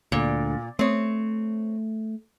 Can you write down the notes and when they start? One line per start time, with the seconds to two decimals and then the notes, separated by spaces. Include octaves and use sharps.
0.12 D2 A#2 D3
0.79 A3 C4 C#5